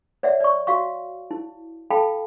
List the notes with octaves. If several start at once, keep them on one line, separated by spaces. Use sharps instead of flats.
C#5 D5 E5 F#5
D5 C#6
F#4 F5 C#6
E4
A4 F5 G5 A5 B5